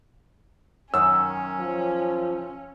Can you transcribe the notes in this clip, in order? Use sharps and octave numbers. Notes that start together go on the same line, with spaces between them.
F#2 D#3 C#4 E6
F3